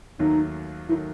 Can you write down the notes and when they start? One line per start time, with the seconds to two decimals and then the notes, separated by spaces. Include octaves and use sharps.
0.19 D#2 D#3 F#3 A3 D#4
0.88 D#3 F#3 A3 E4